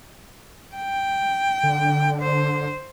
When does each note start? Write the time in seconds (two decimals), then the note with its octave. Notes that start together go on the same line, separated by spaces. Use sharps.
0.75 G5
1.63 D3
2.22 C5